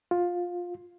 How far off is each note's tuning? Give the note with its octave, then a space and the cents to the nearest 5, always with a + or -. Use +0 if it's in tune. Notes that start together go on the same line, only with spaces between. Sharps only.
F4 +15